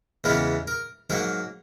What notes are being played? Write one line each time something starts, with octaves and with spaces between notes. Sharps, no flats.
E2 C#3 E3 G#3 B3 A#4
A#4
G#2 F#3 A#3 A#4